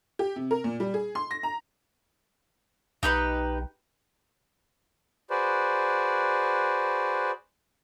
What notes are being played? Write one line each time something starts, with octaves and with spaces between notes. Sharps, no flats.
G4
C3
A#4
A#2
G3
G#4
C6
A#6
A#5
B1 D#4 G4 B4
F#4 G#4 B4 C5 D5